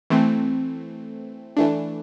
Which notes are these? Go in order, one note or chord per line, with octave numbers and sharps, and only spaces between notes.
E3 A3 C4
E3 A3 D4